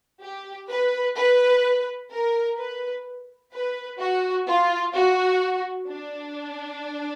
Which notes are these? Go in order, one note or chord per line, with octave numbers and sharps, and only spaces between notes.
G4
B4
B4
A#4
B4
B4
F#4
F4
F#4
D4